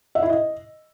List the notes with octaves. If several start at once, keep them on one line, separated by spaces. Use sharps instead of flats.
E5
E4
D#5